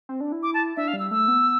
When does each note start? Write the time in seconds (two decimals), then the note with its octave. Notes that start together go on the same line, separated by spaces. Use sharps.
0.09 C4
0.21 D4
0.32 E4
0.43 D6
0.54 A5
0.76 D4 E5
0.88 F5
0.93 G3
0.99 E6
1.11 A3 E6
1.28 B3